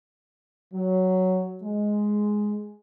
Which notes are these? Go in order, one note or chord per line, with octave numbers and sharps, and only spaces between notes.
F#3
G#3